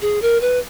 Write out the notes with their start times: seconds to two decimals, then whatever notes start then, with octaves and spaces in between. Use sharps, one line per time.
0.02 G#4
0.22 A#4
0.41 B4